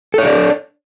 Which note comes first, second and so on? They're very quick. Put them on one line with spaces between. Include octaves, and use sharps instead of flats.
A4 C#5 D4 D5